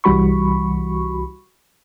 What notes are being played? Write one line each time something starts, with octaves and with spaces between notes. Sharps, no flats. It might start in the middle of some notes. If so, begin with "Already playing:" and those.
C2 E3 G3 F#4 B5 C#6